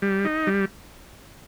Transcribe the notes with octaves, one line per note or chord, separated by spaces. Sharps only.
G3
D#4
G3